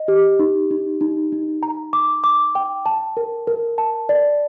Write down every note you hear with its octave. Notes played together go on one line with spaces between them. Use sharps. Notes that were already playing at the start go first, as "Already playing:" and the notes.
Already playing: D#5
G4
D#4
D#4
D#4
D#4
A#5
D6
D6
G5
A5
A#4
A#4
A5
D5